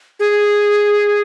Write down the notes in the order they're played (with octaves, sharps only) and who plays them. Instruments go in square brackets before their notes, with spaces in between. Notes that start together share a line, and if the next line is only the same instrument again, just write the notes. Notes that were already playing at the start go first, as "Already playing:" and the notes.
[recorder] G#4